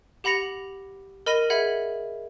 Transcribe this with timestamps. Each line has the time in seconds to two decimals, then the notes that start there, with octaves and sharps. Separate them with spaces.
0.24 G4 F#5 B5 A#6 C#7 F7
1.26 A#4 D#5 B5 A#6 D#7 G7
1.50 G#4 E5 F#5 B5 G#6